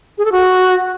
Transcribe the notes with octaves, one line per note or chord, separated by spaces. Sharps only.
G#4
A4
F#4